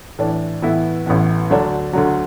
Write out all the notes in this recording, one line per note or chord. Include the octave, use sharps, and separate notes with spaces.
A2 E3 D4
A2 E3 B3 E4
A1 A2 E3 B3
D2 D3 F#3 D4
D2 D3 F#3